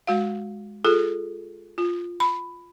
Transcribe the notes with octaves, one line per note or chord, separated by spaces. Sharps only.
G#3 F#4 F5
F4 G#4 A4
F4
B5